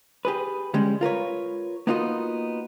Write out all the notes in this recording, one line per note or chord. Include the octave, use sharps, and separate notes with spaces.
G4 G#4 B4
D3 G3 G#3 C#4
F4 A#4 B4 C#5
A#3 B3 D#4 F4 F#4 A#4